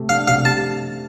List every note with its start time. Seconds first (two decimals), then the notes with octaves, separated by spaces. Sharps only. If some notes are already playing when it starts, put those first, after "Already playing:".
Already playing: C3 A3 G4
0.09 D4 F5
0.28 C3 F5
0.45 G4 A5